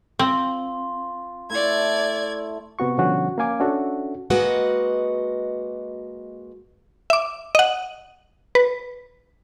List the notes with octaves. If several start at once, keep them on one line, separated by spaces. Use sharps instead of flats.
C4 F4 C6
A3 E4 A4 D5 G#6
C3 B3 F#4 C#6
B2 D3 F3 G3 C#4 F#4
A#3 C#4 F5 G#5 D6
C#4 D4 F#4 A4 E5
G#3 A#3 F#4 B4 D#5 F#5
E5 D6
D#5 F#5
B4